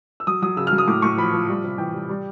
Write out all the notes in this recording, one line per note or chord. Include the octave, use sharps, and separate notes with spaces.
E6
F#3 D#6
F#3 D#6
C#3 E6
F6
F#3
D#6
A2 D6
A2 C#6
F3 B5
F3
G3
C3
E3 G5
G3
G3